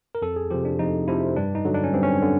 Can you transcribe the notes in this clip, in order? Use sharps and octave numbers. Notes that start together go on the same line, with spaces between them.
A#4
F2 A4
G#4
C3 F3 G4
D4
F2 D#4
C3 F3 E4
G2 D4
D#4
D3 F#3
D4
C#4
G2 C4
C#4
D3